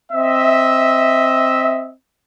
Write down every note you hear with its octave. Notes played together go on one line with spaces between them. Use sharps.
C4 D#5 E5